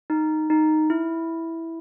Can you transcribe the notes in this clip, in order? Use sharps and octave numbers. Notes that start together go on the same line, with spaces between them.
D#4
D#4
E4